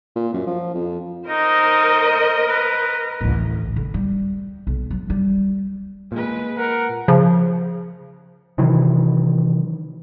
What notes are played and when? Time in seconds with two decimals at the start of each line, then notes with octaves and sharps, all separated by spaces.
0.15 A#2
0.33 F#2
0.47 F3
0.75 F2
1.29 D#4 A#4 C5 D#5
2.48 B4
3.21 A1 D2
3.76 D3
3.94 G3
4.67 B1
4.90 F#3
5.10 G3
6.12 A#2 G#3 B4
6.58 A#4 F#5
7.08 C#3 F3
8.58 C3 D#3 E3 F#3